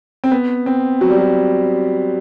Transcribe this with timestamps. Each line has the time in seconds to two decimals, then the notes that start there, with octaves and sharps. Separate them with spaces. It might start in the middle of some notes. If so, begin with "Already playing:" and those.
0.24 C4
0.31 B3
0.66 C4
1.01 F#3
1.10 G3
1.19 F#3